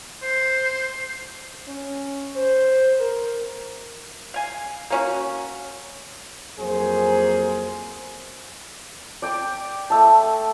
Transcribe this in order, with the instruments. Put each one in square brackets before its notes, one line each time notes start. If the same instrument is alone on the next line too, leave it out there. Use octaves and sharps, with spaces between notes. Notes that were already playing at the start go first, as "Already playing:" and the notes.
[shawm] C5
[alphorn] C#4
C5
A#4
[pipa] F5 G#5
A#3 C#4 F#4
[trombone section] F2 F#3 A#3 G#4 C5
[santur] D5 G5 D6
A3 E5 A5